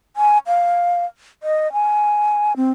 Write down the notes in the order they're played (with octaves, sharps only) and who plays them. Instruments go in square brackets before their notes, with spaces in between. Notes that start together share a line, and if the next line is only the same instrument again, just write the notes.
[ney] G#5
F5
D#5
G#5
C4